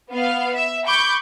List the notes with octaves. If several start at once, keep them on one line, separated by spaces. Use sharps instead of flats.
B3 F5
E5
B5 C#6 D6 G6